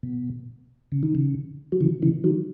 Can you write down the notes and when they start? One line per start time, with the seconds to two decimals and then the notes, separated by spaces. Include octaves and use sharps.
0.03 B2
0.92 C#3
1.03 D#3
1.15 C#3
1.72 F#3
1.81 C#3 E3
2.02 C#3 E3
2.24 D#3 F#3